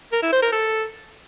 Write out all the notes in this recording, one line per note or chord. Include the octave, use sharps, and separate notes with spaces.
A#4
E4
C5
A#4
A4